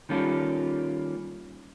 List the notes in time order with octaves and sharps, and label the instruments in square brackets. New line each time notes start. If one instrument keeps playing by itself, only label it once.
[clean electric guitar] D#3 G3 A#3 C#4 F4 A4